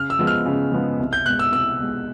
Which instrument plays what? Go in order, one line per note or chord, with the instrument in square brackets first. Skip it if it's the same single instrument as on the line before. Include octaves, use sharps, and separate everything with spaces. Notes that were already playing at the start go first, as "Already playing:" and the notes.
Already playing: [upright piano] C#3 [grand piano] F6
[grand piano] E6
[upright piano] F3 G#3 B3
[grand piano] F6
[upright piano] C#3
F3 G#3 B3
C2
[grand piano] G6
[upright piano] B2 G#3 [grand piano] F#6
[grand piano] E6
[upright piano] C2 [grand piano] E6
[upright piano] B2 G#3